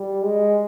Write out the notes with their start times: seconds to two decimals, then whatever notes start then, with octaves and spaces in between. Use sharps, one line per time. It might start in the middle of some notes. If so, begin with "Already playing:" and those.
Already playing: G3
0.23 G#3